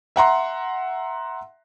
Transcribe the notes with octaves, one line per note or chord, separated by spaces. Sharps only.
E5 F#5 A#5 C6